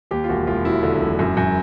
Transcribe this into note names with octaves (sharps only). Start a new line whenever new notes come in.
D#2 G4
F4
E1 F#4
E1 F4
F#3 E4
D3
E1
F#2
F#2